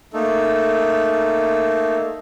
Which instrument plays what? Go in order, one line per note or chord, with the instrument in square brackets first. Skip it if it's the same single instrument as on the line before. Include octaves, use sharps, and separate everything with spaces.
[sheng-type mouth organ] A3 A#3 D#4 A4